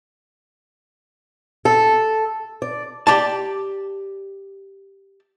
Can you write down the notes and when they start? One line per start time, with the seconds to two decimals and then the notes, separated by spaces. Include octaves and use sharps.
1.65 A4
2.62 D5
3.07 G4 D5 A5